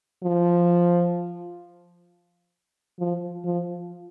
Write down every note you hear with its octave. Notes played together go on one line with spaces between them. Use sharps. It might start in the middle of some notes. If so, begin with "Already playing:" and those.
F3
F3
F3